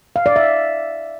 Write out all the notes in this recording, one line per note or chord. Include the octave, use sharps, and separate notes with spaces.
F5
D5
E5